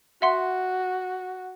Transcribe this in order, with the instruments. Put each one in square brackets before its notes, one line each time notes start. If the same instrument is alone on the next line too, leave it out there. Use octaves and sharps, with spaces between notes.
[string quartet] F#4 [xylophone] E5 F#5 C6